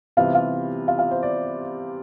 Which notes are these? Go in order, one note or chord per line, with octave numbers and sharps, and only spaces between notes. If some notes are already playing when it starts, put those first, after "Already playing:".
C3 E3 G3 B3 F4
F4
F4
F4
C5
D5